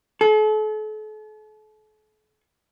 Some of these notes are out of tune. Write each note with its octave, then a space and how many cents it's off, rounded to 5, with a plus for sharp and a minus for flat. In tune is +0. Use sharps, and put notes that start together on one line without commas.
A4 -40